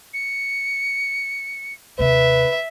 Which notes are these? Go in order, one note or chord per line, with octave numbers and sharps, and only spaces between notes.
C#7
D#2 C3 B4 E5